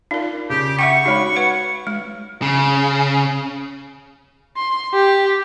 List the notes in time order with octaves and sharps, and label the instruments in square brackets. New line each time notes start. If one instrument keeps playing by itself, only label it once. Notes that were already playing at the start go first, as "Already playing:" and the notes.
[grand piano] D4 F4 [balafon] D#4 A#4
[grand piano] C#3 [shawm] G4
[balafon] E5 F#5 G5 [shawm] C#6
[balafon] G#3 D#4 [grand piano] F#4 C#5 B5
[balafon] B4 F#5
G#3
[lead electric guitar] C#3
[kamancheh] C6
G4